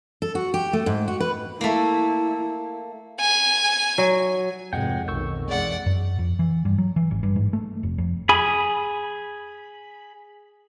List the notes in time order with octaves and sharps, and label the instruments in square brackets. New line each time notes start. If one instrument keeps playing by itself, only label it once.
[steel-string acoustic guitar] A4
F#4
G4
A3
G#2
F#4
B4
[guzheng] A3 A#3 [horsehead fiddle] E4
[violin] G#5
[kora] F#3
[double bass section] F1 G#2 [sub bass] F2 [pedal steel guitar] G#3 F#5 G5
[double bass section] B1 D#3 [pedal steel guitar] C#6 E6 G6
[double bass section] E2 G#3 [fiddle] D5 F#5
[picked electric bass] F#2
F2
E3
G2
F#3
E3
G#1
G2
G#2
A3
F1
F2
[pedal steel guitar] G#4 B5